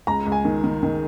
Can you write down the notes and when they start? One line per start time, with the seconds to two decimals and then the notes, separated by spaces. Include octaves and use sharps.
0.07 C#2 A#5
0.26 C#2
0.32 G#5
0.45 D#3
0.64 D#3
0.83 D#3